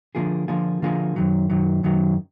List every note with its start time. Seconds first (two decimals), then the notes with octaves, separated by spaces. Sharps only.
0.15 D3 F3 A#3 F4 G#4
0.48 D3 F3 A#3 F4 G#4
0.82 D3 F3 A#3 F4 G#4
1.16 F#2 D#3 F#3
1.50 F#2 D#3 F#3
1.83 F#2 D#3 F#3